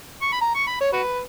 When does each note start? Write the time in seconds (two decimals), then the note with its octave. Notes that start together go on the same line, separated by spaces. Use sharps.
0.22 C#6
0.32 B5
0.41 A#5
0.55 C#6
0.67 B5
0.81 C#5
0.93 F#4 B4